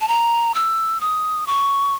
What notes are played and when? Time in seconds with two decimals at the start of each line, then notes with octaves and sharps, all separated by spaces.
0.01 A5
0.08 A#5
0.55 E6
1.01 D#6
1.47 C#6